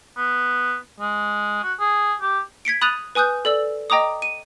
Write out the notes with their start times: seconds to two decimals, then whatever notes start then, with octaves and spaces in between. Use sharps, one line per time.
0.17 B3
1.00 G#3
1.63 F#4
1.80 G#4
2.21 G4
2.65 G#6 B6 C#7 D7
2.81 B5 D#6 F#6 A6 D#7 F7
3.15 B4 G#5 D#6 F#6 G6
3.45 A4 D5 E6 F#7
3.90 D#5 G5 A#5 D6 D#6
4.22 D#7